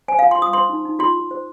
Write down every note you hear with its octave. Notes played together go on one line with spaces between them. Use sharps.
C5 G#5
F4 F5
C6
F4 D#6
C5 C6
D#4
D#4
F4 C6
F4
C5